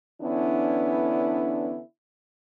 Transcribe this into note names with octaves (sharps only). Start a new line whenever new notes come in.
D3 E3 B3 C#4 D4 E4